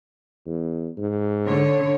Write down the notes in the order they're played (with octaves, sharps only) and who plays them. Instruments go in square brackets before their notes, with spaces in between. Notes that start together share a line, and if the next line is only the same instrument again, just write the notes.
[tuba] E2
G#2
[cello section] D3 C#5